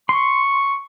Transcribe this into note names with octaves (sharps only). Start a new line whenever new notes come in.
C6 C#6